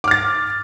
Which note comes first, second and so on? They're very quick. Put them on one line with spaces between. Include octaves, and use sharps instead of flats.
D6 F6 A6